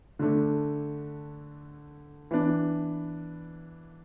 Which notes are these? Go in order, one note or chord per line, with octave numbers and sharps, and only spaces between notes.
D3 A3 D4
E3 B3 D4